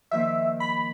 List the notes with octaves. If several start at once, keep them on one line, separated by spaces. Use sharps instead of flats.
D#3 F3 A#3 E5
B5